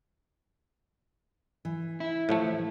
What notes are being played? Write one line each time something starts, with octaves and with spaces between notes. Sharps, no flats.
E3
E4
A2 F3 A3